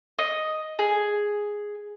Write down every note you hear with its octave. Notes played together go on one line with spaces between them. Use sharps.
D#5
G#4